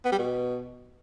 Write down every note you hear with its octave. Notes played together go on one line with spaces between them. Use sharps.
B3
G3
B2